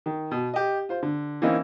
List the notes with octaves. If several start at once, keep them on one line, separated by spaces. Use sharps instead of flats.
D#3
B2
G4 D#5
F4 C5
D3
E3 A#3 C4 C#4 D#4